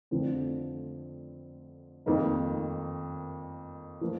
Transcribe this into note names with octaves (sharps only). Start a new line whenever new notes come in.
F2 D3 F3 C4
F2 D#3 A#3 D#4
F3 A#3